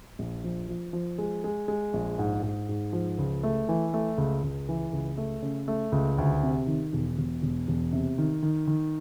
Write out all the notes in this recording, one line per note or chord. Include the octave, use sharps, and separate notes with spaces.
A#1
F3
F3
F3
G#3
G#3
G#3
A#1
G#2
G#2
G#2
F3
C#2
A3
E3
A3
C#2
C#2
E3
C#2
A3
C#3
A3
C#2
D2
C3
D#3
E1
E1
E1
E1
C3
D#3
D#3
D#3